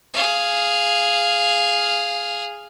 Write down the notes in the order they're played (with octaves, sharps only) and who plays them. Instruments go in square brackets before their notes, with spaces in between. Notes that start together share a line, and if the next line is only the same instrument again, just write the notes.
[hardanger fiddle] G#4 F5